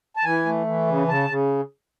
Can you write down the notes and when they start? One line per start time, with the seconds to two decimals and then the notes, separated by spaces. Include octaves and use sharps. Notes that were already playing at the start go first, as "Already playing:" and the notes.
0.17 A5
0.24 E3 G#5
0.46 A3
0.67 E3
0.87 C#3
1.08 C#3 A5
1.29 C#3